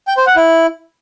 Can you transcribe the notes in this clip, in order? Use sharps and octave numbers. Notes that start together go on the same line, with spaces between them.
G5
C5
F#5
E4